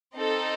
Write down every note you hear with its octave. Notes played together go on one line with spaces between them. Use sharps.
C4 D#4 A4